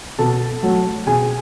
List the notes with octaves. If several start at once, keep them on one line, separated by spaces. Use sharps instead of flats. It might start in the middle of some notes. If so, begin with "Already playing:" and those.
B2 A4 A5
F#3 A3
B2 G#4 G#5